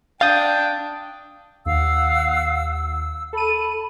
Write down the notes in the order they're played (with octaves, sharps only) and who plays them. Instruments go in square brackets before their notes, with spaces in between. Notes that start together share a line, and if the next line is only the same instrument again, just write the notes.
[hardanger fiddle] D4 [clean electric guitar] F5 [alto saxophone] G5 [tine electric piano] D#6 G6 A6
[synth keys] D#2 [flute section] F5 F#5 E6
[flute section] E6
[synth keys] A4 D#7 [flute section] A5 B5